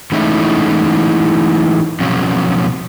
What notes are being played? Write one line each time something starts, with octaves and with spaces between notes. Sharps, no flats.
E3 G#3 A3 C#4 D#4 E4
B2 F3 F#3 C4 C#4